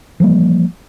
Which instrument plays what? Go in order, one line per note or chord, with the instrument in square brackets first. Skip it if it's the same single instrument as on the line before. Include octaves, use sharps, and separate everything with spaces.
[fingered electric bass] E3 F3 G3 A#3